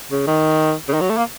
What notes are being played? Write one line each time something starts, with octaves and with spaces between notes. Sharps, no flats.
C#3
D#3
C#3
D#3
F#3
A3
A#3